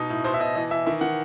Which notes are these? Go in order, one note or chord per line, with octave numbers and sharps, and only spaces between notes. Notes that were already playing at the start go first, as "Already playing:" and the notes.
Already playing: B2 D#4
A2
B2 C5
E5
B2 D#5
E3 D#5
E3 E5
D#3 E5
D#3 F#5